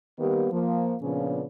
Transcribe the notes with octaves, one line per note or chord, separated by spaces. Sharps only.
D#3 G3 A#3 B3 G4
F3 A#3
A#2 C#3 F3 B3 C#4 D4